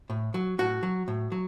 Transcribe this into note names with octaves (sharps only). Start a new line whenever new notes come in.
A2
F#3
A2 F#4
F#3
A2
F#3